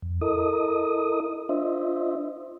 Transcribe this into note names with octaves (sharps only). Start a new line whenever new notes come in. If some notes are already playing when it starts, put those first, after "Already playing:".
F2
E4 A4 A#4 D#5 D#6
D4 F4 C5 D#5 E5